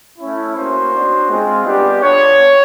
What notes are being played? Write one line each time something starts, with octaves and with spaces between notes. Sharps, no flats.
A3 C#4 E4
A#3 C#4 F#4 C5
B3 D4 F#4
G#3 C4 F4
G3 B3 D4 G4
B3 D4 F4 C#5